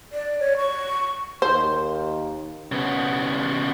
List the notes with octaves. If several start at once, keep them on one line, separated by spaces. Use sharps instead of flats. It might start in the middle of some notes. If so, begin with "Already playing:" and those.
D5
C#5
C#6
D#2 C5
C#3 B3